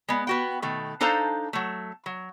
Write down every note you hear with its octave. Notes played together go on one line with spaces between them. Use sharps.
G#3 B3
B3 F#4 G5
B2 D#3 A3
D4 D#4 A4 C5 F5 A#5
F#3 A3
F#3